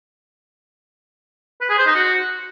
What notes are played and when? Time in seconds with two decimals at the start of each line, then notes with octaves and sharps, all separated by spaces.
1.61 B4
1.69 G#4
1.78 C5
1.86 D#4
1.95 F#4